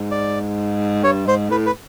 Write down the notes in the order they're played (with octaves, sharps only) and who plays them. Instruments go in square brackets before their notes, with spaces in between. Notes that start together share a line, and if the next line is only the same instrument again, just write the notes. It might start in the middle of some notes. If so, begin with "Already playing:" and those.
Already playing: [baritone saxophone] G#2
[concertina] D5
[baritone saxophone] G2 [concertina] C#5
[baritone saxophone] G#2 [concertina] C5
[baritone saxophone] A2 [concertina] B4
[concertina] B4